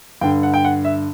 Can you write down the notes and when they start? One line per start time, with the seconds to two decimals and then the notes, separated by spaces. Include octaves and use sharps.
0.21 G2 D3 G5
0.43 F#5
0.54 G5
0.64 F#5
0.85 E5